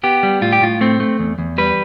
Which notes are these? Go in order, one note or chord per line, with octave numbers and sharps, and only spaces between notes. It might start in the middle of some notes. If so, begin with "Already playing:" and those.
B3 G4
G3
A2 F4
G4
A2 F4
A3 C4
A3
E2
E2
G3 B4